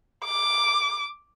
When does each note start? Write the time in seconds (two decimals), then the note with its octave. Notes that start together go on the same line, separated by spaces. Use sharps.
0.24 D6